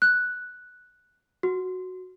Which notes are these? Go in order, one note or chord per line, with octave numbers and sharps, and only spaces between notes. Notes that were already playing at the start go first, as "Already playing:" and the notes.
F#6
F#4